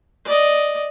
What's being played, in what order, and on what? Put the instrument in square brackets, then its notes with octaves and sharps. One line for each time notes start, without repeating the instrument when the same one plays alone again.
[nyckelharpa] D5 D#5